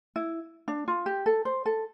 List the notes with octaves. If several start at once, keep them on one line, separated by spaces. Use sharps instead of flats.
E4
D4
F4
G4
A4
C5
A4